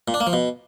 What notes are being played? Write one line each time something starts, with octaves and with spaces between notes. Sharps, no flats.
A#2
D4
A#3
F3
B2